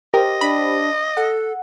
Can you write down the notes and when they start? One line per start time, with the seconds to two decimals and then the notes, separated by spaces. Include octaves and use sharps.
0.14 G4 A#4 C5 D#5
0.41 D4 B5
1.17 A4 F#5